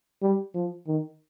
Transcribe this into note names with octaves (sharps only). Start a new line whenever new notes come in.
G3
F3
D#3